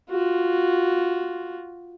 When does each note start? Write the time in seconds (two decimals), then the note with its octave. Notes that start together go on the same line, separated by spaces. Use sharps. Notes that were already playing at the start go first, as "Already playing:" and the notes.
0.11 F4 F#4